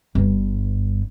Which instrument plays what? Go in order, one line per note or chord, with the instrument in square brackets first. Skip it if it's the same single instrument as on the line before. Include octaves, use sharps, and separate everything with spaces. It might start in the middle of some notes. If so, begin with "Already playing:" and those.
[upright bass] G1 G2